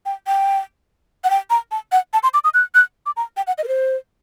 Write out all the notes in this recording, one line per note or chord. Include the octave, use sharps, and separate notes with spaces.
G5
G5
F#5
G5
A#5
A5
F#5
A5
C6
D6
D#6
F#6
F#6
D6
A#5
G5
F#5
D#5
A#4
C5